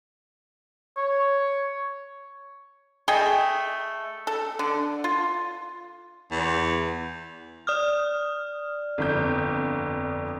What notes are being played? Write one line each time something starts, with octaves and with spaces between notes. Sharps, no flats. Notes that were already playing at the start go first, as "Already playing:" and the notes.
C#5
A3 G#4 D#5 G5
A4
D3
F4
E2
D5 D#6 F6
G1 F2 G6